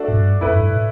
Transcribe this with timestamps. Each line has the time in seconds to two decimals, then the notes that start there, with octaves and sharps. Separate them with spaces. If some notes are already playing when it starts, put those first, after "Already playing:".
Already playing: A3 D4 F#4 A4
0.08 A2
0.12 G2
0.41 F#2 A3 E4 B4
0.56 G2
0.70 A2